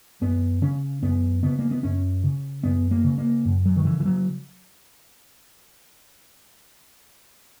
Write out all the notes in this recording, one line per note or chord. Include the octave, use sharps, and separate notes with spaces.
F#2 B3
C#3 C#4
F#2 B3
C#3 B3
A#3
B3
F#2 C#4
C#3
F#2 B3
A#3
C#3
A#3
F#2
F#3
D#3
C#3 E3
E3
F#3